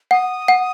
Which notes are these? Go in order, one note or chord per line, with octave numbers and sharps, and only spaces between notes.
F#5 D#6
F#5